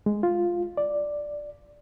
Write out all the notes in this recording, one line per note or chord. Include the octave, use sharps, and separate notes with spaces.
G#3
F4
D5